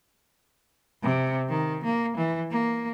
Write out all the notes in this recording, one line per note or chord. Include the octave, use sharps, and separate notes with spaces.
C3
D#3
A#3
E3
A#3